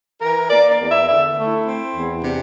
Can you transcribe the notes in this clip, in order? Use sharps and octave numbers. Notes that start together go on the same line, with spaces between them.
E3 A#4
A#3 D5
D5
E2
E5
D3 E5
A3
E4
C4
E2
C3 D4